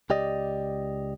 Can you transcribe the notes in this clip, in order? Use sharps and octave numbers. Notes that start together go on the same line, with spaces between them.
C#2 G4 D5 D#5